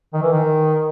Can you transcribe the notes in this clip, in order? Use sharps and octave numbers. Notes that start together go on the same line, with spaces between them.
D#3
E3
D#3